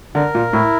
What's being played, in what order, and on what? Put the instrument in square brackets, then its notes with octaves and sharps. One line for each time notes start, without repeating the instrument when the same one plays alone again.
[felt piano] D3 [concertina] A#4
[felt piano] A#2
[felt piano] A2 [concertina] E4